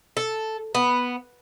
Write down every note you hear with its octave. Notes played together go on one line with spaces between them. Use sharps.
A4
B3